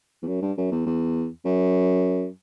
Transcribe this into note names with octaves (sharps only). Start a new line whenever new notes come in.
E2
F#2
G2
F#2
E2
E2
F#2